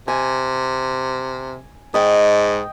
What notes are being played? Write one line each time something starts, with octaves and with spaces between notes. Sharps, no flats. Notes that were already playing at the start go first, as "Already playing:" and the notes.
C3 G#5
G#2 D#5 G5